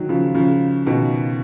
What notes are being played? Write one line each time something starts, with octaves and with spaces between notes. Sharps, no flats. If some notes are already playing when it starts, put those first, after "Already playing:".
Already playing: D#3 F#3
C#3 F3
C#3 F3
B2 D#3